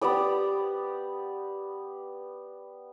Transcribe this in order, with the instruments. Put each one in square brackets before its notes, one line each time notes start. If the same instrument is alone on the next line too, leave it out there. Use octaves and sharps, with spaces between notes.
[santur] B3 G4 D5 D#6